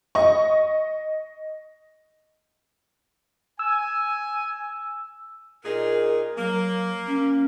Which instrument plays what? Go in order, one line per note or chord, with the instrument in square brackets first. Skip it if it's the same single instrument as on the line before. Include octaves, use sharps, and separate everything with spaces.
[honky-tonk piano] D#5 C#6
[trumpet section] G#5 [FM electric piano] E6
[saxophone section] A#2 D#4 G#4 [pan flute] A#4
[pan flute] F#3 [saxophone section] A#3
[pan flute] C#4